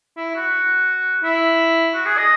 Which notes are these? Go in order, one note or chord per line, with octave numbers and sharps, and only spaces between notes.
E4
F#4
E4
F#4
G#4
D#5